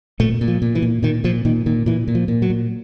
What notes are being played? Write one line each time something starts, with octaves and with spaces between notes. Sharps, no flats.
A#2 A3
A#2
F3
A#2
E3
A#2
A#2 D#3
A#2 F3
A#2 D#3
A#2 D#3
A#2 E3
A#2
F3
A#2
F#3
A#2